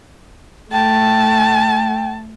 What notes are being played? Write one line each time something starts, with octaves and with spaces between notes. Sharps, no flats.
A3 G5 A5